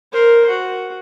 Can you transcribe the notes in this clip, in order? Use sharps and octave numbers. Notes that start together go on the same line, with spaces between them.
A#4 C5
F#4